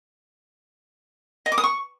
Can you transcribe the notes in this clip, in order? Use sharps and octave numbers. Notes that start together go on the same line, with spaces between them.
D#5
D6
D#6
C#6